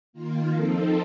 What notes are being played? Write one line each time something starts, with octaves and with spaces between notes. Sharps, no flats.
D#3 A#3 F4
F3 C4 D#4 A4